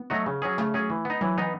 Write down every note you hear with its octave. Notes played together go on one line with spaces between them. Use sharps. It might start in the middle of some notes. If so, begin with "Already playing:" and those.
Already playing: B3
F#3 A3 D#4 F#4
C#3
F#3 C#4 G#4
C#3 A3
F#3 C#4 G#4
E3
B3 D#4
E3 F#3
E3 B3 D#4